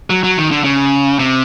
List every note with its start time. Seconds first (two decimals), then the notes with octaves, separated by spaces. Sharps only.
0.10 F#3
0.24 F#3
0.37 D#3
0.51 D3
0.64 C#3
1.19 C3